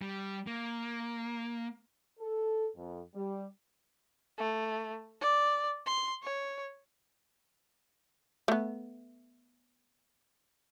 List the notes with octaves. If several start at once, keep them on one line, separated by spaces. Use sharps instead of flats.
G3
A#3
A4
F2
G3
A3
D5
C6
C#5
A3 B3